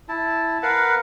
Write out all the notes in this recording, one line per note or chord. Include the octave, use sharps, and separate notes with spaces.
E4 A5
A#4 B4 F5 F#5